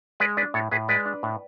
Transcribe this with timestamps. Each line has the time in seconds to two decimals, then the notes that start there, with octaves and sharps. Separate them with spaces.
0.20 G#3 B4 D5
0.37 D4 B4 D5
0.54 A2 A4 C#5
0.71 A2 G#4 B4
0.89 G#3 B4 D5
1.06 D4
1.23 A2